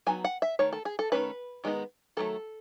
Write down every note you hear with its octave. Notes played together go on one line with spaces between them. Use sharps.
F#3 B3 D#4 G#5
F#5
E5
D#3 A3 C#5
A4
G#4
A4
D#3 F#3 A3 C#4 B4
D#3 G#3 B3 D#4
D#3 F#3 A3 A4